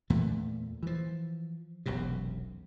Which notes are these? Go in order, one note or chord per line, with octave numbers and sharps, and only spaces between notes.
E2 A#2 E3 A3
E3 F3
E1 B1 F#2 C3